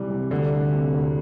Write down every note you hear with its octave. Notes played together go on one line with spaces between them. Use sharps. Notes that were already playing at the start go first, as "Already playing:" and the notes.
Already playing: C3 E3 G3
C3
D2 D3
A3
C3
D2